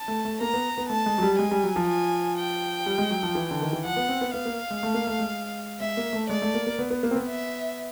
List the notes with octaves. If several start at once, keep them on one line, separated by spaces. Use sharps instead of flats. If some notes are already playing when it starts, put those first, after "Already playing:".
Already playing: A5
A3
A3
A#3 A#5
B3
B3
A3 A5
G#3
F#3
G3
G#3 G#5
G3
F#3
F3
G#5
G5
G3
G#3
F#3
F3
E3
D3
D#3
E3
F3 F#5
B3
C4
B3
B3 F5
A#3
G#3
A3
A#3
A3
G#3
G#3 E5
A#3
A3
G#3 D5
A3
A#3
A#3
B3
B3
A#3
C4
B3
E5